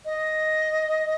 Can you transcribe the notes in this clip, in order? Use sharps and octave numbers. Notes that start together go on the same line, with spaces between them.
D#5